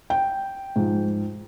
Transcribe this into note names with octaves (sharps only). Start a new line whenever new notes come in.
G5
G#2 F3